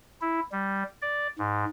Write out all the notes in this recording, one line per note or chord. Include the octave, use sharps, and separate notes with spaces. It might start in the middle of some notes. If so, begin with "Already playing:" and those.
E4
G3
D5
G#2